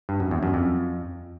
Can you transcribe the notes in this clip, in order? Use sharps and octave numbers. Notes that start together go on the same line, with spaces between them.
G2
F#2
E2
F#2
F2